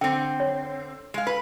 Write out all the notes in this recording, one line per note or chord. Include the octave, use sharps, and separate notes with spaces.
D3 C4 G5
C#5
G#3 F5
B4